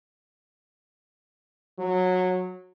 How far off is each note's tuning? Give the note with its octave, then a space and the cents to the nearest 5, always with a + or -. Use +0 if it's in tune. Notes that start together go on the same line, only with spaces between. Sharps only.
F#3 -15